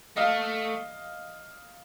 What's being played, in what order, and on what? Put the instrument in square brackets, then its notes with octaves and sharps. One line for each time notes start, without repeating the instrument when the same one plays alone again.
[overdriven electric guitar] A3 [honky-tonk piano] D#5 F5